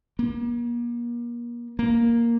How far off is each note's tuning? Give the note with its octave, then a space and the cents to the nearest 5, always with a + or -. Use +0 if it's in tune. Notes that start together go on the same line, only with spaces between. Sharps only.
A#3 +35
A#3 +0